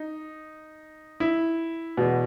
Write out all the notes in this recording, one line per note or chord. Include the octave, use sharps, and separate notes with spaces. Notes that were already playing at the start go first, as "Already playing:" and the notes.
Already playing: D#4
E4
E2 B2